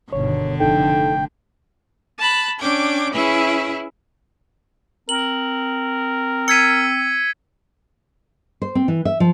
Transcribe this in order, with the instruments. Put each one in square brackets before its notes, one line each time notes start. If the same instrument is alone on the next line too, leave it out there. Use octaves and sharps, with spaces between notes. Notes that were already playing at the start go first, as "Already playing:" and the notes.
[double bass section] G1 B2 D#3 [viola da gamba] D3 [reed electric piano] C#5
[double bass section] F1 [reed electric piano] D4 D#4 A4 [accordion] G5
[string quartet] A5 B5 F#6
C#4 D4 G5 D6 G#6
C#4 E4 G#4 B4 E5
[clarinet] C4 [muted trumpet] A#4 [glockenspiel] F#7
[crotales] E6 G#6 B6 [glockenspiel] C#7 D#7
[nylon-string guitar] C5
C4
E3
E5
F3